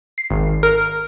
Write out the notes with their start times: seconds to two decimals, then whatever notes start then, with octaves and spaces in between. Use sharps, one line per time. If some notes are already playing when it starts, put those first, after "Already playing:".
0.18 C7
0.30 G#1
0.63 A#4